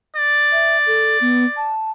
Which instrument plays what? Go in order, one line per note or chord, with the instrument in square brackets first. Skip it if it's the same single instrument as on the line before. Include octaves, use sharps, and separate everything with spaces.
[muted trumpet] D5
[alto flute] E5
A4
B3
A5